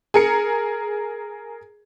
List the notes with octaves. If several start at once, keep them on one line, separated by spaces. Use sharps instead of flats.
G#4 A#4 C#7